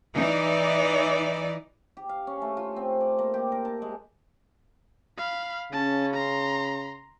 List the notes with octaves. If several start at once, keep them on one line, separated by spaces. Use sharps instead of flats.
E3 D#4 D5
G4
F5
C#4
A3
F4
C4
D5
A#3
G4
A#4
A5
G#3
F5 B5
C#3 C#4 A5
A#5 C6